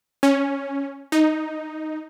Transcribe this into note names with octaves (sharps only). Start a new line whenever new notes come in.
C#4
D#4